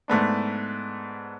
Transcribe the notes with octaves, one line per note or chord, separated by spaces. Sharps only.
G#2 A3 B3 D4